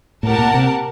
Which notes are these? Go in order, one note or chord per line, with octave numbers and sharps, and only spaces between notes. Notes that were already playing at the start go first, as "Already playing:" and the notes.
A2 G4 A#4 F#5 A5
A#2
C3